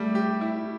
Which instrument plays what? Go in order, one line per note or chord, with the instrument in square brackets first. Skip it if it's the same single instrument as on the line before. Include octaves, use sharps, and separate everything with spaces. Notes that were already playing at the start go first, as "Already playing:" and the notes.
Already playing: [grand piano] G3 G4 [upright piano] A3
[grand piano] G4
E4